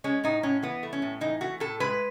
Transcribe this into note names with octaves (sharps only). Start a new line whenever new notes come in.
G#3 C#4
A2 D#4
A2 C#4
E3 B3
A3
C#4
A2
E3 D#4
A3 F#4
A2 A4
G#3 B4